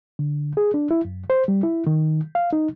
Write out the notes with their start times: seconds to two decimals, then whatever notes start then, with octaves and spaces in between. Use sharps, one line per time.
0.19 D3
0.57 G#4
0.74 D4
0.91 E4
1.05 F#2
1.30 C5
1.48 G3
1.63 E4
1.87 D#3
2.35 F5
2.53 D#4